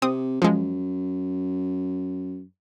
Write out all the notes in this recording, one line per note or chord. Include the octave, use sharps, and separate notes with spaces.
C3 C4 D#6
F#2 F3 G#3